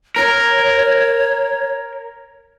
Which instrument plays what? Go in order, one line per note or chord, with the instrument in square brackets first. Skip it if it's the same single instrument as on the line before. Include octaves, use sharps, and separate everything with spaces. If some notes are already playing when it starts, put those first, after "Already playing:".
[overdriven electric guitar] A#4 [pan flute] C#5